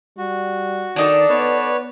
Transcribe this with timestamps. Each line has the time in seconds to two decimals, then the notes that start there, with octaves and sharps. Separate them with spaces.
0.18 G3 F#4
0.96 D#3 D4 D#4 A4 D5
1.30 B3 B4 C#5